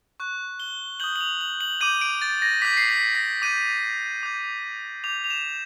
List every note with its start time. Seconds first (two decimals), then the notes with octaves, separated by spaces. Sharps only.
0.20 C#6 F#6
0.60 G7
1.00 D#6 G6 F#7
1.16 F#7
1.21 F7
1.41 F#7
1.61 F#7
1.81 D6 G6 D#7
2.01 D7
2.22 A6
2.42 A#6
2.62 D6 G6 B6
2.77 C7
2.89 B6
3.15 A#6
3.42 D6 G6 D#7
4.23 D6 G6
5.04 D6 G6 F7
5.24 F7
5.30 E7